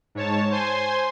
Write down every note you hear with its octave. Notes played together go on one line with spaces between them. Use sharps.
G#2 C#5 A5
C5 G#5 C6